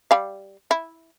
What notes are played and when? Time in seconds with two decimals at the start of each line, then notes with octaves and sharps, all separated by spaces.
0.11 G3 F5
0.71 E4